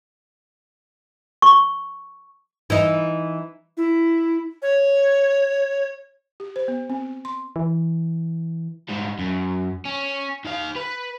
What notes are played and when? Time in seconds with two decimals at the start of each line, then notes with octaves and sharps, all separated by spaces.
1.42 C#6
2.70 E3 D#4
3.77 E4
4.62 C#5
6.40 G4
6.56 C5
6.68 B3
6.90 C4
7.25 C6
7.56 E3
8.89 G#2 G3
9.19 F#2
9.85 C#4
10.45 D#3 F5
10.76 B4